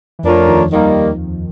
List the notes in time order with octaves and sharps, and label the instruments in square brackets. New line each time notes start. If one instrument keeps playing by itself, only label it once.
[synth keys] E3
[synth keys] F2 F3 [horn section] A3 D4 F4 A#4 C#5
[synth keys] D#2 D#3
[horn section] D#3 G3 A#3